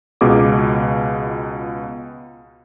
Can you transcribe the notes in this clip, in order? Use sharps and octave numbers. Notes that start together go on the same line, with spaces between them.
C#2 B2 F4 G#4 G#5 D6